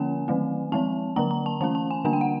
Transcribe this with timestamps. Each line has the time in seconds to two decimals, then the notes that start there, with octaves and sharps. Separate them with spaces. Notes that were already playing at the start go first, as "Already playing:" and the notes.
Already playing: D3 F3 A#3 C#4 G#5
0.28 D#3 F#3 A3 C4
0.72 F3 G#3 C4 A5
1.16 D3 F#3 A#3 A#5
1.31 A#5
1.46 A5
1.61 E3 A3 C#4 A5
1.75 A5
1.91 G#5
2.04 D3 G3 A#3 D4 G#5
2.13 G5
2.21 F#5